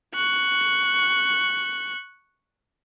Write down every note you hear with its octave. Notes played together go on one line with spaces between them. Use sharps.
C#6 F#6